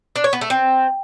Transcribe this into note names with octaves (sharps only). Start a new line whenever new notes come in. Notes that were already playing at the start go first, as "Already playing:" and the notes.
D4
C#5
B3
A3
C4